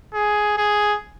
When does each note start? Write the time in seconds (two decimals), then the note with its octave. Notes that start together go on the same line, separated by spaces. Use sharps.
0.14 G#4
0.57 G#4